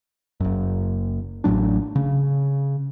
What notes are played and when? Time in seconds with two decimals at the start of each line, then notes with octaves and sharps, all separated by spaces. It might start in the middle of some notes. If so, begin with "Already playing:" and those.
0.40 F#1 F#2
1.44 A1 A2 F#3 D4
1.96 C#3